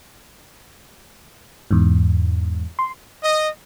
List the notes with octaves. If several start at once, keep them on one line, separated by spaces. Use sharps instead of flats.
E2 G#2
C6
D#5